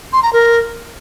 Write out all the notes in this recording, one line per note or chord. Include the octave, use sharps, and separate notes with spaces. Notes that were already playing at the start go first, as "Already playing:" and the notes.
C6
A#5
A#4